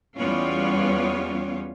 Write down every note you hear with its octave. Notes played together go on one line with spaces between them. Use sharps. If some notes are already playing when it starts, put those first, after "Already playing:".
E2 G3 B3 C#4 F4 C#5